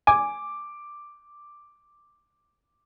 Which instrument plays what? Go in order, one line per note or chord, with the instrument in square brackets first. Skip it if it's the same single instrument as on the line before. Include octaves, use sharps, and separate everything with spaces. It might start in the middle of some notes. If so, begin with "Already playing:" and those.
[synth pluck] G#5 [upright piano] D6